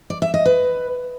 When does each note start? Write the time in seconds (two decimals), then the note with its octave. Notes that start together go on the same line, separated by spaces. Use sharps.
0.10 D5
0.22 E5
0.34 D#5
0.46 B4